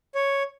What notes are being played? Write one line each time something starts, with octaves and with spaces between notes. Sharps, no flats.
C#5